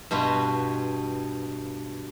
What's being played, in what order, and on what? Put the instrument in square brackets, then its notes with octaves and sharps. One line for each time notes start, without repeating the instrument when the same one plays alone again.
[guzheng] G2 B2 F#4 C6